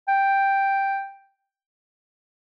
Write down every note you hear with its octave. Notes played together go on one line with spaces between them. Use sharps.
G5